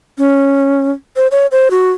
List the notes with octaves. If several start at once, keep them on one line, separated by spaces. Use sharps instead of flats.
C#4
C5
C#5
C5
F#4